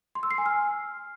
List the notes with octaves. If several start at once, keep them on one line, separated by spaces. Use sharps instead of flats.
C6
E6
C7
G#5
F6